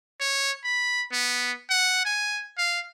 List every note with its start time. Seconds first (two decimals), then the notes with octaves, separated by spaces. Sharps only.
0.20 C#5
0.64 B5
1.12 B3
1.70 F#5
2.05 G#5
2.58 F5